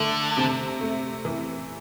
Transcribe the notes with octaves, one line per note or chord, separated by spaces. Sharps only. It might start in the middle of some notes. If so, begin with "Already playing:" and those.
Already playing: D3 A3
C3
A3
E3